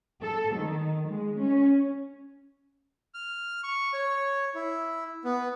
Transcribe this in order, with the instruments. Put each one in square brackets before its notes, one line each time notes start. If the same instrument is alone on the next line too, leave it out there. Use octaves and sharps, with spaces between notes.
[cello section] A4
D#3
G#3
C#4
[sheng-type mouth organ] F6
C#6
C#5
E4
B3